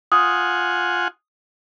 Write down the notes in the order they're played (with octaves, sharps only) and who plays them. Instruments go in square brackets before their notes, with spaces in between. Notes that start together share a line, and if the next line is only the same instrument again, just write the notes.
[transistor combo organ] F4 F#5 G#5 [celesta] D#6